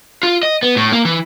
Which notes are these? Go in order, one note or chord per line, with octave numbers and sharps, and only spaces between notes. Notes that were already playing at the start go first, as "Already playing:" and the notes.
F4
D#5
B3
A2
A#3
E3